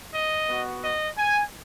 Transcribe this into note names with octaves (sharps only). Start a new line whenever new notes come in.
D#5
B3 F#4
D#5
G#5